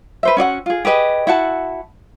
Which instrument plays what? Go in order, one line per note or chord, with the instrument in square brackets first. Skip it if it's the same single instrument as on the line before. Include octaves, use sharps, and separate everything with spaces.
[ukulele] B4 C5 E5
C#4 F#4 D5 F#5
F4 G#4
G4 G#4 B4 D#5
E4 F#4 F#5 A5